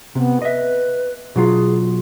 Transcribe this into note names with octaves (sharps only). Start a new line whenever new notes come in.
C3 B3
B4 D#5 E5
B2 F#3 F4 G#4